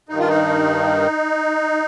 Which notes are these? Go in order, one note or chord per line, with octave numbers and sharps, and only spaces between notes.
G2 D#3 D#4
F4
D#4